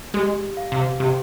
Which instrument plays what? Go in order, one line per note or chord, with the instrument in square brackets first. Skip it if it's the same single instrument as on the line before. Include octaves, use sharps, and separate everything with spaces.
[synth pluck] G#3 [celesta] G4
[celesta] F5
[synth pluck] C3
[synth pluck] C3 [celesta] G4